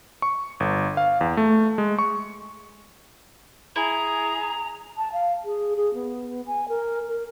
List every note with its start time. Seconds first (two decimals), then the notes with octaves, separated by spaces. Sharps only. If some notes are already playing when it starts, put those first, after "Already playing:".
0.22 C#6
0.60 G1
0.97 F5
1.21 E2
1.37 A3
1.78 G#3
1.99 C#6
3.76 E4 G#4 A#5
4.97 A5
5.13 F5
5.45 G#4
5.76 G#4
5.94 B3
6.47 G#5
6.69 A#4
7.08 A#4